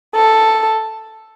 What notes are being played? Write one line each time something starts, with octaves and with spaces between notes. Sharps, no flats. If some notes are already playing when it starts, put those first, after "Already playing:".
A4